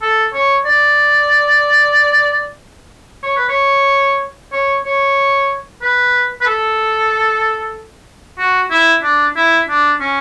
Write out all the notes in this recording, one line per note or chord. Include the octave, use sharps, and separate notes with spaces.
A4
C#5
D5
C#5
B4
C#5
C#5
C#5
B4
B4
A4
F#4
E4
D4
E4
D4
C#4